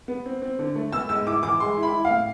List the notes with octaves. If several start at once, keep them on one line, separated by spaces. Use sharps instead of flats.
B3
C4
C4
D3
A3
B3 E6
G#2 E6
E4 D6
E3 D6
G#3 C6
E4
B5
E4
F5
A2